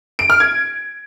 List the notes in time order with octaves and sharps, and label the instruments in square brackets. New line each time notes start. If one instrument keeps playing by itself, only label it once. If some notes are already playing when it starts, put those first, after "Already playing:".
[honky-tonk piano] D7
F6
G#6